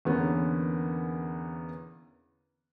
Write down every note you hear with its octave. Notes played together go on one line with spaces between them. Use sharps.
E2 D3 A#3 B3 C#4